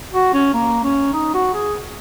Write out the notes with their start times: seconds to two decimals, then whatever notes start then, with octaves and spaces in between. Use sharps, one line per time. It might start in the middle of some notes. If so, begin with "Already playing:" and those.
0.13 F#4
0.33 C#4
0.54 A#3
0.84 C#4
1.14 D#4
1.34 F#4
1.53 G#4